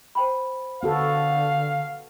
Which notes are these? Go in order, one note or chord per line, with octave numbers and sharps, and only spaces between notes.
C5 G5 B5
D3 B3 F#4 A4 F5